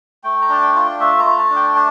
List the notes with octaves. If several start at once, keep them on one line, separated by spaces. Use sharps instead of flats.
A3 G5
A#5
D4 A5
G5
F4
A3 E5
A#5
A3
A5
D4
G5
A5